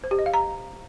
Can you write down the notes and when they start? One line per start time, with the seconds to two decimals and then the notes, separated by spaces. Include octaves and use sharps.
0.04 C5
0.11 G4
0.19 D#5
0.26 F5
0.34 A#5